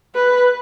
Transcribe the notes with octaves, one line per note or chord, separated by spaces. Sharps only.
B4